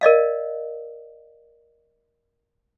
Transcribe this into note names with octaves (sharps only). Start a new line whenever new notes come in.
A#4 D5 D#5 F5